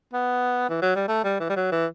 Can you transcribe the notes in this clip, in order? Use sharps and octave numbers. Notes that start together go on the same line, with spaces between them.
B3
E3
F#3
G3
A3
G3
E3
G3
F#3
E3